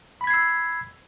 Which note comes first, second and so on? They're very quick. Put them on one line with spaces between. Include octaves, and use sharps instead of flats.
B5 B6 G#6 C7 E6